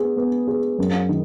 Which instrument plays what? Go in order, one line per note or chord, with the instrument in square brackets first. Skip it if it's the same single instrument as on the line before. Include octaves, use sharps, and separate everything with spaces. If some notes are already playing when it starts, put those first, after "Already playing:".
Already playing: [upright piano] B3 G#4
B3
G#4
F#2
D#3